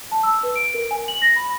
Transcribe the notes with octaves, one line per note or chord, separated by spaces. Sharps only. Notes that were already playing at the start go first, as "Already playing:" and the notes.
A5
E6
B4
D7
A#4
G#5
F#7
A#6
B5